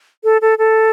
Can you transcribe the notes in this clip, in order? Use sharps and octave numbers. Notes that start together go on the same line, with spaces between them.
A4
A4
A4